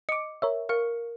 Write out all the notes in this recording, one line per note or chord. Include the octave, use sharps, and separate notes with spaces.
D#5 D6 C#7
A#4 C#5 E5
A#4 F5 C#6 C#7